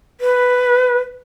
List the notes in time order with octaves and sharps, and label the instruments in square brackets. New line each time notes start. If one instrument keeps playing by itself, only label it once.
[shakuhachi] B4